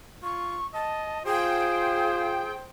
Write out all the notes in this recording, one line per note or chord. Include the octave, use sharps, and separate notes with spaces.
F4 C#6
D#5 A5
F4 G#4 C5 G5